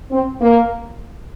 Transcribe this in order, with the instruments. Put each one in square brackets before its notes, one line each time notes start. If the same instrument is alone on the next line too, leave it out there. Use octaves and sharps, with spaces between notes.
[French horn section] C4
A#3